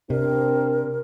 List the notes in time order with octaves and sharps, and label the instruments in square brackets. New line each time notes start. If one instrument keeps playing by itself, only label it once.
[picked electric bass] C3 [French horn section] C4 D4 [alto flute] A#4